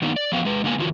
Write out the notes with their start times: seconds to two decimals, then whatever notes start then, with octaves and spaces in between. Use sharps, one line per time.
0.02 D#3 A#3 B3 D4 D#4
0.16 D5
0.32 E3 F3 B3 F5 G5
0.45 G#3 B4
0.64 D3 G#3 A#3 B3 G#5
0.79 E2 D#3 F4 F#4